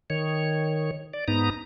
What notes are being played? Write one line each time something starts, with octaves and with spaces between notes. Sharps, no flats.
D#3 C#5
D5
G#2 B3 D#4 A#5